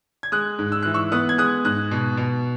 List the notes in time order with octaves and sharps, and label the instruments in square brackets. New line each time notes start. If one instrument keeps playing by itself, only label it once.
[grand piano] G#6
G#3 D#6 F#6
G#2
E6
E3 F#6
C#6 E6
B3 D#6 F#6
G#6
G#3 D#6 F#6
G#2 D#6 F#6
B2
B2